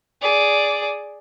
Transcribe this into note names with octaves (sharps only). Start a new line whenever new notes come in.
G#4 D5